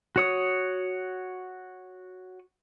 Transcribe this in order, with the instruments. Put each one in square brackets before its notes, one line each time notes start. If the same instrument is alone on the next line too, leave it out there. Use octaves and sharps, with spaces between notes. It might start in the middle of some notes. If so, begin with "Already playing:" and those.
[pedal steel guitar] F#4 C#5 D#6